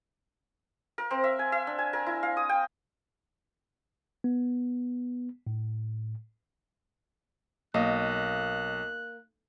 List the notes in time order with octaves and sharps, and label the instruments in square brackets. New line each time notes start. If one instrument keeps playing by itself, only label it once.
[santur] A#4
C4
E5
G#5
E5
D4
G#5
A#4
E4
F5
D#6
G5
[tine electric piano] B3
A2
[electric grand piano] B1 D#5 [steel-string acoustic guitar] A#3 [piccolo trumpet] F#6